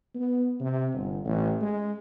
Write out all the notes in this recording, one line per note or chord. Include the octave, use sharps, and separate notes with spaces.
B3
C3
G1
A1
G#3